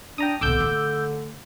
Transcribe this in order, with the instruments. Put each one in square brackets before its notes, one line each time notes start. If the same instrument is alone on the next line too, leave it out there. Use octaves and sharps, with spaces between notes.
[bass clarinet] D4 [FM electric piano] G5 A#5 D#6
[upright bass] C2 B2 [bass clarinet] D3 [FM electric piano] D6 E6 G6
[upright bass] A3